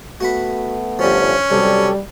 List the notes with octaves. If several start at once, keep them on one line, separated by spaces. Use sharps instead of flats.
A3 B3 F#4 F#5 B5
G1 F3 G3 C#4
B1 C3 G3 A4 D5